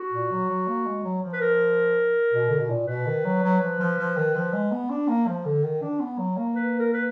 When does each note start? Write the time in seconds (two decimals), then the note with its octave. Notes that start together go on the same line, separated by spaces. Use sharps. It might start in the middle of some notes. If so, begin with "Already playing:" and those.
Already playing: F#4
0.12 A#2
0.31 F#3
0.49 F#3
0.67 A#3
0.86 G#3
1.04 F#3
1.23 F3
1.33 B4
1.41 A#4
2.33 B2
2.49 D3
2.59 B2
2.69 A#2
2.87 B2 B4
3.06 D#3
3.24 F#3
3.43 F#3
3.61 F3
3.79 F3
3.98 F3
4.16 D#3
4.35 F3
4.53 G#3
4.71 B3
4.90 D4
5.08 A#3
5.27 F3
5.45 D3
5.63 D#3
5.81 D4
6.00 B3
6.18 F#3
6.37 A#3
6.55 B4
6.79 A#4
6.93 B4